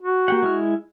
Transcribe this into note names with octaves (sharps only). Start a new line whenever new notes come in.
F#4
A#3 G4 F#5
G#3 E4 F6